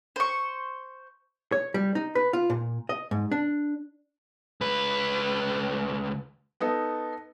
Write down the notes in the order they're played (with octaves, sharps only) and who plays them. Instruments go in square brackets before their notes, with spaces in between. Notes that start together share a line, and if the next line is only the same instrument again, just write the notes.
[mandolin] C5 C#6
[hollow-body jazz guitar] C#5
G3
D#4
B4
F4
A#2
D#5
G#2
D4
[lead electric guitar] C#2 B4
[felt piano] B3 D#4 A4